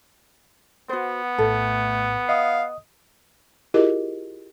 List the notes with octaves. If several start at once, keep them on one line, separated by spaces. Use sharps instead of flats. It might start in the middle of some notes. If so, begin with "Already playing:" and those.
B3 F#4 C5
A#1 A2 A3 A4
D#5 F5 D#6
E4 F4 G4 G#4 A#4 D#5